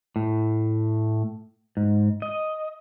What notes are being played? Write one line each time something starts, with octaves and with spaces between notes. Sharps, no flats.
A2
G#2
D#5